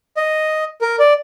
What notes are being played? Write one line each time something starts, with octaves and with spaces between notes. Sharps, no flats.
D#5
A#4
D5